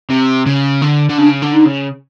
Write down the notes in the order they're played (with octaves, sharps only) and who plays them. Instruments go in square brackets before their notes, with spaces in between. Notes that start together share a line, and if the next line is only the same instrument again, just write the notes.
[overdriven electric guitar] C3
C#3
D3
D3
[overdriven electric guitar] C#3 [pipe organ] D4
[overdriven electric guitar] D3
[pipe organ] D#4
[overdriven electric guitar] C#3